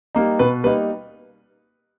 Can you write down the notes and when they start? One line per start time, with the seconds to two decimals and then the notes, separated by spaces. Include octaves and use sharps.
0.15 G3 A#3 D#4
0.39 B2 B4
0.64 G3 A#3 D#4 B4